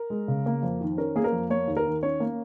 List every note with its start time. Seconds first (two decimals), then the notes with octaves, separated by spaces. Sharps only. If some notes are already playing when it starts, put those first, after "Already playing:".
Already playing: A#4
0.10 G#3
0.28 C#3
0.46 A#3
0.63 F2
0.81 D#3
0.97 C#4 A#4
1.16 A#3 G#4
1.24 A#4
1.32 F2
1.50 A#3 C#5
1.68 D#2
1.77 A#4
1.85 D#3
2.03 C#4 C#5
2.20 A#3